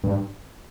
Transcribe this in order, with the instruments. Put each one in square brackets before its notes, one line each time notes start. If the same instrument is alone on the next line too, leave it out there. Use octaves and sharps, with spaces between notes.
[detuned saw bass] G2